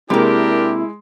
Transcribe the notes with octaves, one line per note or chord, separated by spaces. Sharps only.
C3 G#3 A#3 D4 E4 G4 A#4